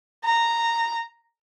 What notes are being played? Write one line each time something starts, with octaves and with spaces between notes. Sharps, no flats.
A#5